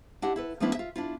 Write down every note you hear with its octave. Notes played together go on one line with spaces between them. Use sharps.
D4 E4 G4 D#5 F#5
E4 A4 B4
F3 A3 B3 C#4 D4 E4
F4 E5
D4 E4 F4